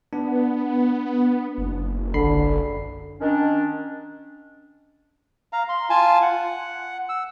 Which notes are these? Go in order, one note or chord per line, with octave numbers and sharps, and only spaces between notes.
B3 D4
F#1
B1 D3 B5 C7
D#3 C#4 D4
F5 A#5
C6
F4 G#5 A5
F#5
E6